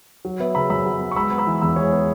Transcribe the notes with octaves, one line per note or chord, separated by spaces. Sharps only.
F#3
B3 B4 E5
C#3 B5 E6
F#2 B5 E6
F#3
B3
C#6
G#3 B5 E6
B3
B5 E6
E3
E2 B5 E6
G#3 G#4 C#5
B3